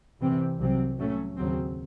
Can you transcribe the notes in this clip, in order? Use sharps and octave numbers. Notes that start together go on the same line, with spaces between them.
C2 C3 E3 C4
C2 C3 F#3 C4
A2 F#3 A3 C#4
D#2 C#3 F#3 C4